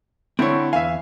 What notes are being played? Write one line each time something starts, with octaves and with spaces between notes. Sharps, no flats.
D3 C4 E4 C#5
E2 E5 F5 G#5